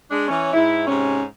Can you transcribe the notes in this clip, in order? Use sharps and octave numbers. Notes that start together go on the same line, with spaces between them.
G#3 D4
E3 C#4
G#2 E4
G#2 C3 C#4